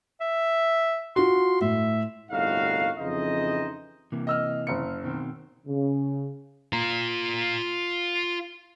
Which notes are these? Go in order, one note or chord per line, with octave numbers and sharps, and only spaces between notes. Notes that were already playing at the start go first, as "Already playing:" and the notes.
E5
F4 F#4 C6
A2 E5
G1 C2 A2 D#4 F#4 F5
F2 C#3 E3 D#4 C5 D#5
C3 E3 A#3
D#5 E6 F6
F#1 C#7
B2 D#3 C4
C#3
F4 A#5